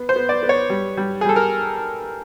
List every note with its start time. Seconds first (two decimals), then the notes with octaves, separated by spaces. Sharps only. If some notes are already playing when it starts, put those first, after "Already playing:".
Already playing: B3
0.09 C5
0.16 B3
0.29 D5
0.43 B3
0.49 C#5
0.70 G3
0.97 G3
1.21 G#4
1.25 G3 A4
1.36 A#4